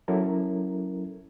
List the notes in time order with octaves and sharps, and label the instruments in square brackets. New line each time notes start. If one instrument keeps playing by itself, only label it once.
[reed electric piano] F#3 C#4 E4 A4 A#4